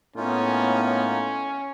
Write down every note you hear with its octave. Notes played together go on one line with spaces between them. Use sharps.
A2 A#3 B3 C#4 D#4 F4